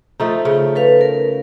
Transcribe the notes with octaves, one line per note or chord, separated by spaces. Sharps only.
F3 A3 D#4
C#3
A4 B4 F5
A#4